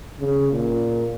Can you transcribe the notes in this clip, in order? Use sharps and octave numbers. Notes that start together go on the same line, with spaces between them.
C#3
A#2